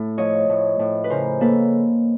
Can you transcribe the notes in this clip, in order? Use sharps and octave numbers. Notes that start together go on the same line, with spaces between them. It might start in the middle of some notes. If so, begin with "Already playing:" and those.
Already playing: A2 A3
F3 C#5 D#5
A2
A2
B4
C#3 A#4 C5
A#3 A4 B4